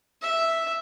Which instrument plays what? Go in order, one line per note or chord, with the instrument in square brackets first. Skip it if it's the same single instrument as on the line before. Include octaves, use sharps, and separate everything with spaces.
[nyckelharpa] E5